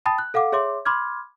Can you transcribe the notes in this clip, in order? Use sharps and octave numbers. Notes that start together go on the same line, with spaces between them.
G5 A5 B5 D#6 A6
F#6
A4 F5 F#5 D6
G#4 C#5 E5 C6 D6
B5 C6 D6 F6 G#6